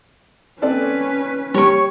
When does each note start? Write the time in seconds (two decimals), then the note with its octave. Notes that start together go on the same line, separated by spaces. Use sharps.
0.62 C4 C#4 A4 B4 D5
1.54 G3 C#5 C#6